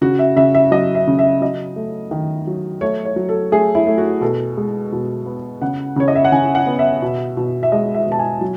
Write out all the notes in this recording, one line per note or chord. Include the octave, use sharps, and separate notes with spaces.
C#3 F#4
E5
C#3 E5
E5
F#3 D#5
E5
C#3
E5
F#3 D#5
A3
D#3
F#3
A3 C#5
C#5
F#3
A4
A3 G#4
E4
A3
F#4
B2 A4
G#3
B2
B3
C#3 F#5
C#3 C#5
D#5
E5
F#5
C#3 G#5
F#5
B3
E5
B2
B2
E5
G#3 D#5
E5
B2
A5
G#5
F#3